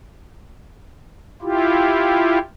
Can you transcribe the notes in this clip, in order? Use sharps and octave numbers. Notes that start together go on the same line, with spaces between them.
E4 F4 G4